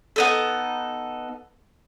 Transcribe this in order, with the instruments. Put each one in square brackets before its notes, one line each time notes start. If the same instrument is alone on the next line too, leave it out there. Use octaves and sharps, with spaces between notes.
[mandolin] B3 D#4 A4